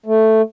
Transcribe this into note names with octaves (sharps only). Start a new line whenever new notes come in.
A3